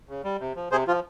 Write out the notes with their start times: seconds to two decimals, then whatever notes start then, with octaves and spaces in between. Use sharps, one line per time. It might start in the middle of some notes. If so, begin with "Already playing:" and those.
0.09 C#3
0.24 G3
0.40 C3
0.56 F3
0.71 C3 G#4 C5
0.87 F3 F4